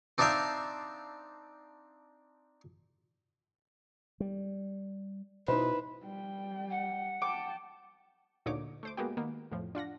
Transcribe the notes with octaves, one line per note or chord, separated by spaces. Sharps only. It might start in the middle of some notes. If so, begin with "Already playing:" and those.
C4 D4 D#4 E5 F5 G5
G3
B2 D#4 E4 B4 C5
G3 G5
F#5
G5 A5 D6
D2 A#2 D3 D#4 C#5 D6
A3 C5 D6
G#3 A#3 B3 F#4 G4
D#3 A#3 B3
F2 A2 F3
D4 F4 F#5 A#6